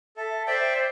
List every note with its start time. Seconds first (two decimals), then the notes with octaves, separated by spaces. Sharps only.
0.17 A4 E5
0.47 C5 D5 E5 G5